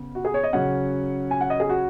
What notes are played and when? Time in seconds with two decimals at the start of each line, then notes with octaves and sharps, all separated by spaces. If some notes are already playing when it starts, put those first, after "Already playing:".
Already playing: C#3 B3
0.15 F#4
0.25 G#4
0.34 C#5
0.43 D#5
0.53 C#3 F#3 C#4 F#5
1.31 G#5
1.41 F#5
1.50 D#5
1.60 G#4
1.69 F#4